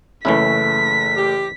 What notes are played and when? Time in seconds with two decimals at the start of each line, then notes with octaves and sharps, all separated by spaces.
0.25 F#1 E3 A3 C#4 E4 B6
1.16 G4